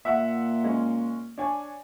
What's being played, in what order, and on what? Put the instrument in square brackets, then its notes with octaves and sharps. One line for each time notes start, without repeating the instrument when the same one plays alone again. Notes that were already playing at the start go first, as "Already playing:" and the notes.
[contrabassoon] A#2 [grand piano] E5 F#5
[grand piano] G#3 C#4
D4 C#5 G#5